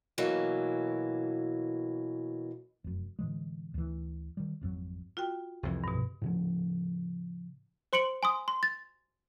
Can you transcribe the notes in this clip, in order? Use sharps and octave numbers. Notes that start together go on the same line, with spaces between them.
B2 E3 F#3 A#3
F1 F#2
A2 D3 E3 G#3
D2 E3
D#3 G3
G#1 F2 B2 F#3
F4 F#4 G5
C2 F2 E3
G2 B2
A2 C#3 F3
C5 C6 C#7 D7 F#7
G#5 C6 D#6
C6
A6